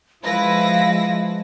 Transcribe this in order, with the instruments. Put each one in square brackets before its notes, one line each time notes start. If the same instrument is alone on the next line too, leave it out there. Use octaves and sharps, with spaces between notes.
[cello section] F3 [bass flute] G#3 [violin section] E4 B4 A#6 [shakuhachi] F5